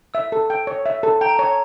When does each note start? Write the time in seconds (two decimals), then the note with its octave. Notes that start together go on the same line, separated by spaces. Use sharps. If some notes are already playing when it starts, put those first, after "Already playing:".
0.14 E5 E6
0.32 A4
0.50 G5
0.67 C#5
0.86 E5
1.03 A4
1.21 G5 A#5
1.29 A5
1.39 C#5
1.45 A5